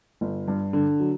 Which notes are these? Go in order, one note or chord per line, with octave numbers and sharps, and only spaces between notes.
G1
G2
D3
F#3